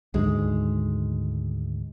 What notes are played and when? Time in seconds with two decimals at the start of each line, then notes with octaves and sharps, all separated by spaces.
0.14 D2 G#2 D#3 G#3